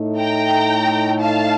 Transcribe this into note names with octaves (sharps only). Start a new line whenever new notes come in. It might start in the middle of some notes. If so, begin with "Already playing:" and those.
Already playing: A2 A3 D#4
G5 A#5
F5 A5